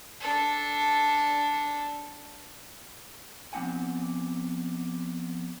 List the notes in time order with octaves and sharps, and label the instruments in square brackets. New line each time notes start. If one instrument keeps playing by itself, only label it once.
[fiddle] D4 A4
[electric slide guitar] F3 B3 C4 D4 F#5 G#5